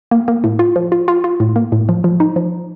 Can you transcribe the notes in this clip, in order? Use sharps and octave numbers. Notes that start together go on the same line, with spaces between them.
A#3
A#3
A2
F4
F3
F4
F4
F4
A2
A#3
A2
F3
F3
D#4
F3